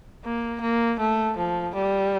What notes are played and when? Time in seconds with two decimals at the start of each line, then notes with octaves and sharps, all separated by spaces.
0.25 A#3
0.62 A#3
1.00 A3
1.37 F3
1.75 G3